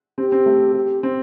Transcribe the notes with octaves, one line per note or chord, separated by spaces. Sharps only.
C4 G4
C4
A3
G4
C4